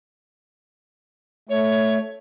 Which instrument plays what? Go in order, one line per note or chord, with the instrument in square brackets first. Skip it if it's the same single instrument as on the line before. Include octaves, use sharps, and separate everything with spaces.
[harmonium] A3 [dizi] C#5